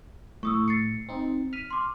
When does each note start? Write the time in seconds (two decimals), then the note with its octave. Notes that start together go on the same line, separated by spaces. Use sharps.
0.43 A2 C#6 D#6 E6
0.68 A6 C7 C#7
1.09 C4 D#4
1.53 F6 B6 D#7
1.71 C6 D6